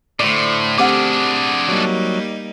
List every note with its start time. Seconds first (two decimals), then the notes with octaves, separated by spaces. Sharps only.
0.20 A2 D3 A3 C5 D5
0.78 C4 D4 G4 G#4 F#5 D6 F6
1.68 F#3 G3 A#3 D#4